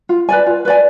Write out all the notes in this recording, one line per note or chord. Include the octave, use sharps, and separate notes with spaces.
F4
B4 D5 G#5
F4
B4 D5 G#5